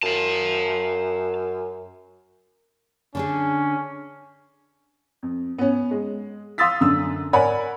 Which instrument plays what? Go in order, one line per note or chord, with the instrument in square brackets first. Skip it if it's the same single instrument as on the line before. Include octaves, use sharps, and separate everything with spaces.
[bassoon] F#2 [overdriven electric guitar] F5 A5
[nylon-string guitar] D3 D4 G#4 [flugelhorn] C#4
[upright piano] F2
B3 C#4
G#3
F5 C6 D#6 E6 A6 B6
F#2 D3 E6
A#4 C#5 D5 F#5 G#5 B5